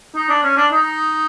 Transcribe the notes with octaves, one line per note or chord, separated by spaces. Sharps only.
D#4
D4
C#4
D4
D#4